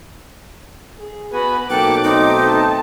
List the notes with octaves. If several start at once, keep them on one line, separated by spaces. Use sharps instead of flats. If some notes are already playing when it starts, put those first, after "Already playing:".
G#4
B3 F#4 B4 G#5 B5
B1 A#3 A4 G5 D6 F#6
A3 C4 D#4
A5